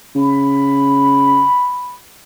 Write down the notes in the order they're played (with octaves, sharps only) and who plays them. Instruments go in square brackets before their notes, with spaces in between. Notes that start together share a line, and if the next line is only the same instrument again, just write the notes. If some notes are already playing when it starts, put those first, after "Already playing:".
[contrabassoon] C#3 [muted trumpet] B5